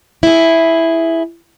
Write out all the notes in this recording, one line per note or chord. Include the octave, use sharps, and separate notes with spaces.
E4 G#4